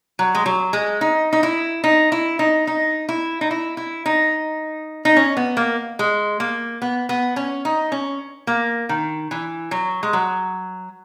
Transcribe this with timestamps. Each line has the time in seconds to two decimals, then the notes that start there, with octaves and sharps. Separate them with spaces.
0.19 F#3
0.35 G#3
0.46 F#3
0.73 G#3
1.01 D#4
1.33 D#4
1.43 E4
1.84 D#4
2.12 E4
2.39 D#4
2.67 D#4
3.09 E4
3.41 D#4
3.51 E4
3.77 E4
4.06 D#4
5.05 D#4
5.16 C#4
5.37 B3
5.57 A#3
5.99 G#3
6.40 A#3
6.82 B3
7.09 B3
7.36 C#4
7.65 D#4
7.92 C#4
8.47 A#3
8.89 D#3
9.31 E3
9.71 F#3
10.03 G#3
10.13 F#3